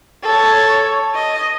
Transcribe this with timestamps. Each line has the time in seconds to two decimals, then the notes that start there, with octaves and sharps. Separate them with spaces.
0.23 A4 C#5
1.15 D#5